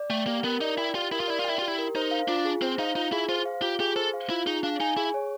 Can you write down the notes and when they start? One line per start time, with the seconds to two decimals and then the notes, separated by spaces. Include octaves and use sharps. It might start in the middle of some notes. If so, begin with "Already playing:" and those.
Already playing: D5
0.10 A3 G5
0.27 A#3 G4
0.44 B3 A#4
0.61 D#4 D5
0.78 E4 G5
0.95 F4 G4
1.12 E4 A#4
1.20 F4
1.28 E4 D5
1.39 F4
1.44 E4 G5
1.59 F4 G4
1.68 E4
1.78 A#4
1.95 D#4 C5
2.11 F5
2.28 D4 F4
2.45 G#4
2.62 C4 C5
2.79 D#4 F5
2.95 D#4 F4
3.12 E4 G#4
3.29 F4 C5
3.46 F5
3.62 F4 G4
3.80 G4 G#4
3.96 A4 C5
4.14 F5
4.30 E4 F4
4.46 D#4 G#4
4.63 D4 F5
4.80 D#4 G#5
4.97 E4 G#4
5.14 C#5